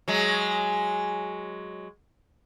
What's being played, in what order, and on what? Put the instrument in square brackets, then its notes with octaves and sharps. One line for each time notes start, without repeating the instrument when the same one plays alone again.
[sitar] F#3 G#3